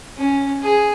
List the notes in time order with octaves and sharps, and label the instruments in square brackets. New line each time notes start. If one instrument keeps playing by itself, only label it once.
[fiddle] C#4
G#4